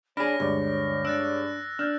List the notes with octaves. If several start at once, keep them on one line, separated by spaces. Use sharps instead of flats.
D4 G#4 C#5 B5 F6 A#6
D2 G2 G#3 D5
D4 E6 F#6 A6
D4 F6 G6